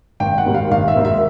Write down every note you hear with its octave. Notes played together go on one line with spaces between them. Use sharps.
G#1 G5
F#5
G#2 D#3 G3
F5
G#1 F5
E5
G#2 D#3 G3
E5